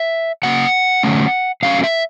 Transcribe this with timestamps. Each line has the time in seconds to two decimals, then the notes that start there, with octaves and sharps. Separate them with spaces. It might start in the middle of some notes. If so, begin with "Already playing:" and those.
Already playing: E5
0.43 C#3 F#3 A#3 F#5
1.03 D3 F#3 A3 C#4
1.63 D3 F#3 A3 C#4 F5
1.84 E5